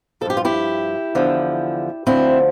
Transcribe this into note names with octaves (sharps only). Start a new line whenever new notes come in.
G2 F3 G4 A4
F4
E4 G4
E2 D3 F3
D2 D3 F3 C4 E4